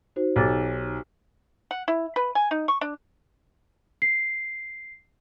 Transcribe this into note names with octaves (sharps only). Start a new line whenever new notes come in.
D#4 F#4 C5
B1 G4 D6 A6
F#5
E4
B4
G#5
D#4
C#6
D4
C7